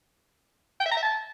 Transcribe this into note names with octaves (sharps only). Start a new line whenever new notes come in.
G5
E5
A#5
E5
A5